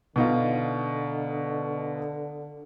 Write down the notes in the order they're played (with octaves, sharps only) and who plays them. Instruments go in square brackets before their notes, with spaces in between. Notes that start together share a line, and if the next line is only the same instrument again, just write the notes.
[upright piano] B2 D#4 F4 [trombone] D3